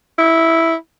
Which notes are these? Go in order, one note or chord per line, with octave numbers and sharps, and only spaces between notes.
E4